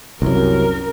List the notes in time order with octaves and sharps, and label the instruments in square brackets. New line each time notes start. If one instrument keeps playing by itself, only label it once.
[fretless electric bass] C2 F#2 [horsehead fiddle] A#4